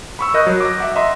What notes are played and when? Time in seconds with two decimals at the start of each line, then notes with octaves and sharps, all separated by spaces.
0.19 B5 C#6 E6
0.34 A#4 D#5 F#6 G6
0.47 F#3
0.60 D6 A#6
0.78 E5 F#5 D6
0.95 D#5 E5 A#5 C6